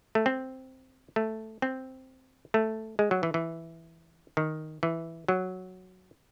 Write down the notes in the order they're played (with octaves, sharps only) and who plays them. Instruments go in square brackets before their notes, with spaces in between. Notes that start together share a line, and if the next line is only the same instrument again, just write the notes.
[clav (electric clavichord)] A3
C4
A3
C4
A3
G#3
F#3
E3
E3
D#3
E3
F#3